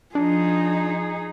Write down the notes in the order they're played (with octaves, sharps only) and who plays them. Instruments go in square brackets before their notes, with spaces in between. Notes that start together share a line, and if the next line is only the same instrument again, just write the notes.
[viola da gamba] F3 [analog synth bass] D4 [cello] D#4 G#4